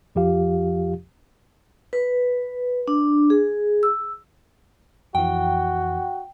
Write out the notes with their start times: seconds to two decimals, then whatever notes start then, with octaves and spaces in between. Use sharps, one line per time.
0.15 F2 F3 F4 G4 F5
1.93 B4
2.88 D4
3.30 G#4
3.83 E6
5.15 F2 E3 F#4 G5